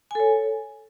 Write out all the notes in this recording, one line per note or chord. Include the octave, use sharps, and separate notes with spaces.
A4 C#5 G#5